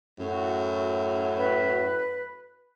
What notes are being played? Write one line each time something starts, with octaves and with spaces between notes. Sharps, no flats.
F#2 A2 F#4
B4